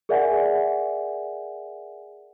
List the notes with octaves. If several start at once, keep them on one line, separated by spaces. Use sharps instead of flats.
G#4 A#4 D5 E5 F#5 G#5